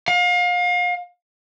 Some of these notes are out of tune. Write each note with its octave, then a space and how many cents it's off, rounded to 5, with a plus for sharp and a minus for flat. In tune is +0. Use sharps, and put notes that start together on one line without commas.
F5 +35